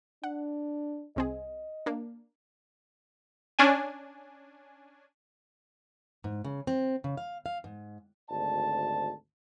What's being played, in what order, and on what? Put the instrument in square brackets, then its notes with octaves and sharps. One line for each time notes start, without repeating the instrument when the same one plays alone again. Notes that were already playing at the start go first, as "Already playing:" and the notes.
[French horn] D4 [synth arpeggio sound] F#5
[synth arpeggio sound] C2 C4 G#4 [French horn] D#5
[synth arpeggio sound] A#3 D4
[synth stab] C#4 D4 G#5
[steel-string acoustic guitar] G#2
C#3
C4
C#3
F5
F5
G#2
[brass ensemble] G#1 D2 D5 A5